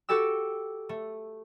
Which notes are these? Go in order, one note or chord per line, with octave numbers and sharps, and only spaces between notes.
F#4 G4 A4 G5 E6
A3